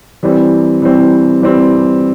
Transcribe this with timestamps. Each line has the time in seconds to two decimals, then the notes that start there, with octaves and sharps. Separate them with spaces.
0.23 E3 G3 C4
0.82 E3 G3 C4
1.42 E3 G3 C4